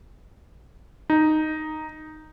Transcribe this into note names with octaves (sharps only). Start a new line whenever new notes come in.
D#4